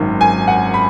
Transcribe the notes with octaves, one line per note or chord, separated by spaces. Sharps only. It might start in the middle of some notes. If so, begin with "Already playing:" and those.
Already playing: G#1 F#2 D#3
G#5
F#5
B5